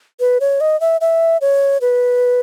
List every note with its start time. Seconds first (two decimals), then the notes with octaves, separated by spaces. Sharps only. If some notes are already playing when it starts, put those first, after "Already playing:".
0.20 B4
0.41 C#5
0.61 D#5
0.81 E5
1.01 E5
1.41 C#5
1.81 B4